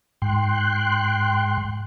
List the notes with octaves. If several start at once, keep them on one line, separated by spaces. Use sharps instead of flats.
G#2 G5 C6 F#6